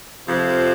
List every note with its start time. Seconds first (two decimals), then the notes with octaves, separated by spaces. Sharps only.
0.28 F2 C3 F3